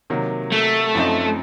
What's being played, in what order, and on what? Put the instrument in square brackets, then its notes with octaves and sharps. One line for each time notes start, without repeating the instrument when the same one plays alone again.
[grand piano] C3 D#3 F#3 A#3
[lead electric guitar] A3
[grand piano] F#2 F3 C4 D#4